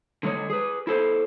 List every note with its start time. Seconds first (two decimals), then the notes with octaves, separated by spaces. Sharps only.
0.23 D3 G#3 C#5
0.50 G#4 B4
0.87 E4 A4 C5